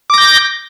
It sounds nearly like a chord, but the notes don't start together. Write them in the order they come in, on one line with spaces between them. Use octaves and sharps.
D6 A#6 G6